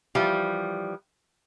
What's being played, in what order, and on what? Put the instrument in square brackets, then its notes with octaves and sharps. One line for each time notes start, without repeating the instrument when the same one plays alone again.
[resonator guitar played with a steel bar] E3 F3 G3